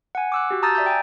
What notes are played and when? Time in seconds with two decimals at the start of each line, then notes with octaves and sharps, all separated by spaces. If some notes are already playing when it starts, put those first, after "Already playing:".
0.15 F#5 G#5
0.32 D6 E6 F#6
0.51 F#4 G4
0.63 A5 A#5 D#6 E6 G6 A6
0.75 D5 E5 A#5 G6
0.86 G5 G#5